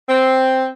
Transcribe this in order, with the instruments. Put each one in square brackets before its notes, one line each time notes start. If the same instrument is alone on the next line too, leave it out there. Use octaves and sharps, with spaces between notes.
[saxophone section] C4